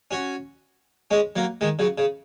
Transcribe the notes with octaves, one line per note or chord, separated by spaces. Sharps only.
C#4 F#4
G#3 C#4
F#3 A#3
D#3 G#3
C#3 F#3
C#3